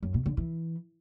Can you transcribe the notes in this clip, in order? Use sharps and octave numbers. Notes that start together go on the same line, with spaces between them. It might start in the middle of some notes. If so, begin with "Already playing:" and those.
F#2
B2
D3
E3